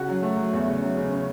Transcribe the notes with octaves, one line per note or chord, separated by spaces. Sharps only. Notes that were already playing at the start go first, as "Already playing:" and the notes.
Already playing: C#3 F#4
F#3
A3
F#3
E2
C#3
F#3
C#3
C#3 C#4